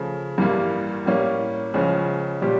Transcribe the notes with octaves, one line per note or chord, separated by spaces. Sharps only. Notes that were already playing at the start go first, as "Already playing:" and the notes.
Already playing: C#3 F3 A3
A1 G2 E3 G3 A#3
A2 G3 A#3 C#4
C#2 C#3 F3 C#4
A#2 G3 C#4 G4